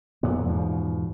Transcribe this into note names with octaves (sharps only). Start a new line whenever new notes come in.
F2 A#2 B3
E2 G#2 B2 F3